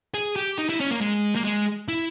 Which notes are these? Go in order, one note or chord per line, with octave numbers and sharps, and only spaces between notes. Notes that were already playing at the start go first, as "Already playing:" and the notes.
G#4
G4
D#4
E4
C#4
A#3
G#3
A#3
G#3
E4